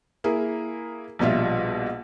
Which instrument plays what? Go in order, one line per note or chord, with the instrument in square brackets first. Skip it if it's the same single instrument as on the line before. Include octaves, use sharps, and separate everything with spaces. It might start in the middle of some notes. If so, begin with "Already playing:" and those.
[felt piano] A#3 E4 G#4
A#1 B2 G3 F4 E5